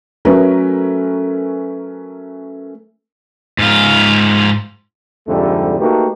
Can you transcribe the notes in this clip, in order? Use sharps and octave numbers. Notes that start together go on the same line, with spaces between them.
F#3 A3 C#4 A#4 B4
G#2 F4
C2 F2 G#2 D3 G3 A3
A3 A#3 D#4 F#4 G4 B4